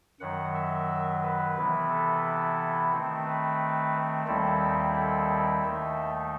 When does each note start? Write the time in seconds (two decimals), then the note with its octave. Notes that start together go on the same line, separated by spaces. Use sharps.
0.20 F#2 D#3 F#3 F#5
0.55 E5
1.23 B4
1.56 C3 E3 B3 E4
1.90 A4
2.92 D#3 A3 C4
3.26 B4
4.27 D#2 D#3 G3 C4 E4 A4
4.95 A4
5.63 D#2 D#3 A3 D#4 E5